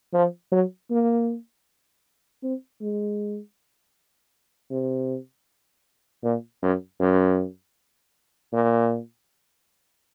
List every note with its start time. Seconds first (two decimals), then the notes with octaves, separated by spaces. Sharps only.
0.13 F3
0.52 F#3
0.90 A#3
2.43 C4
2.81 G#3
4.71 C3
6.23 A#2
6.62 F#2
7.00 F#2
8.53 A#2